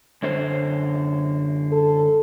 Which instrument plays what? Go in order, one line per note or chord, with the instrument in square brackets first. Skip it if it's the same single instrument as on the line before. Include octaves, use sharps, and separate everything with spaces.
[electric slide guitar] F#2 D3 C5
[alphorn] A4